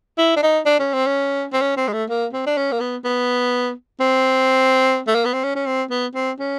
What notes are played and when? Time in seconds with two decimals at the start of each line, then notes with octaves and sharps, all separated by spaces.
0.18 E4
0.36 D4
0.42 D#4
0.66 D4
0.79 C#4
0.93 C4
1.06 C#4
1.53 C4
1.61 C#4
1.77 C4
1.88 G#3
1.93 A3
2.09 A#3
2.33 C4
2.46 D4
2.57 C#4
2.72 A#3
2.80 B3
3.04 B3
4.00 C4
5.07 A3
5.15 A#3
5.25 B3
5.33 C4
5.44 C#4
5.56 C#4
5.66 C4
5.90 B3
6.15 C4
6.39 C#4